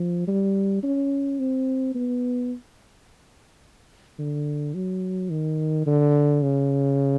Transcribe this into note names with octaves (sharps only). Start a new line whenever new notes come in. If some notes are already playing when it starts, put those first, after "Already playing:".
Already playing: F3
G3
C#4
C4
B3
D3
F#3
D#3
D3
C#3